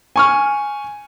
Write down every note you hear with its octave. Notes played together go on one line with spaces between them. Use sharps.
G#5 C#6 F6